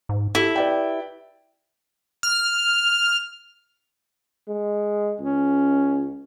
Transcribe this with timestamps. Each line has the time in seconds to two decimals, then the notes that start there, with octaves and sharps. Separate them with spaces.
0.09 G#2
0.35 E4 G4 A4
0.56 B4 D5 G5
2.23 F6
4.49 G#3
5.20 C#2 C#4